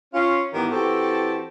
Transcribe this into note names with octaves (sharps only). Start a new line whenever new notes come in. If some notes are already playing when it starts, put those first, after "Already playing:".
C#4 F4
G#2 D#3 E3 B3 E4 G4
E3 C4 F#4 G4 A4